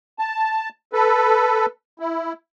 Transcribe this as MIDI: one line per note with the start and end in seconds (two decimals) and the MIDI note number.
0.19 0.69 81
0.93 1.66 69
0.93 1.66 71
1.99 2.33 64